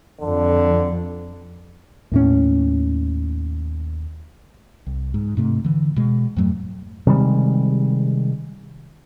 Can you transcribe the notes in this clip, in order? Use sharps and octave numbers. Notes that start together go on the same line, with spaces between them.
F2 D3
D#2 A2 C#4
C2
G#2
G#2 C3 A3
D3 E3
B2 G#3
F2 G#2 F#3 A3
C3 D#3 G3 G#3